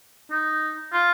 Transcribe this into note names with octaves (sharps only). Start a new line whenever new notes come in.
D#4
F4